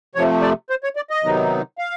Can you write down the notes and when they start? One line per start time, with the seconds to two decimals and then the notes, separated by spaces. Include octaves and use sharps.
0.15 C3 F3 A3 C#5
0.42 D5
0.70 C5
0.84 C#5
0.96 D5
1.10 D#5
1.24 C3 D#3 F#3 B3 D#4
1.78 F5